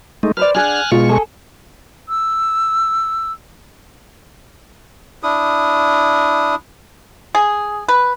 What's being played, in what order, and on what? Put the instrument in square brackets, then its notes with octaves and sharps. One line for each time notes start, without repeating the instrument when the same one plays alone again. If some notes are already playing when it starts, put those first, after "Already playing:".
[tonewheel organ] G#3 A3 D#4
[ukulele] B4 C5 D5 [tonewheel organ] F6
[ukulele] D4 G#4 F#5 [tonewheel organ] G#5 F6 F#6
[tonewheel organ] B2 G#3 C#6 [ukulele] F4
[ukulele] G#4 A4
[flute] E6
[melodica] D4 E4 D#6
[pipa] G#4
B4